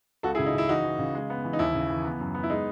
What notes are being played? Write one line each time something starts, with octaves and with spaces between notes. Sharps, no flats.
C#2 F#4 A4
E4 G#4
C#3
D#4
C#3 E4
E3 D#4 F#4
E3
C#3
G#3
B3
E3
D#4
D#2 E4
C#3
E3
B3
F#2
B3
E4
G#3 D#4